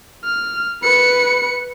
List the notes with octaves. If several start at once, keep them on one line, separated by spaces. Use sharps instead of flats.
F6
B4 C#7